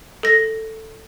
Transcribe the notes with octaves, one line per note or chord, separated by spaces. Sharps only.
A4 A#6